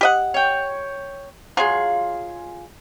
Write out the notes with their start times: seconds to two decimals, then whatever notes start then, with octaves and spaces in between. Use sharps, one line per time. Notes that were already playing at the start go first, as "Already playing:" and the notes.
0.01 G4 D#5 F#5
0.34 C#5 G5
1.57 F#3 G#3 F4 G#4